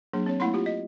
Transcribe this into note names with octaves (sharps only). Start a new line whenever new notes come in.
F#3 A#3 D4 G#4
C4 C#5
A3 A#3 E4 F#5 B5 C6
F4 G4
D#5